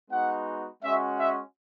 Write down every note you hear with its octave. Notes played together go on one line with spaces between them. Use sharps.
G#3 B3 D#4 F#4 F#5
G#3 C#4 F#4 E5
E5